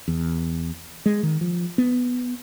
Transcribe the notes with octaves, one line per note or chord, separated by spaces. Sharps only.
E2
G#3
D#3
F3
B3